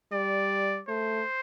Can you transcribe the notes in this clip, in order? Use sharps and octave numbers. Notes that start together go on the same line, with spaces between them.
G3 D5
A3 C5